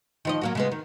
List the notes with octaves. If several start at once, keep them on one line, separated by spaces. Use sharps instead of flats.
D#3 F3 D#5
F#3 A#3 F#4
C#3 G#3 B3
D#3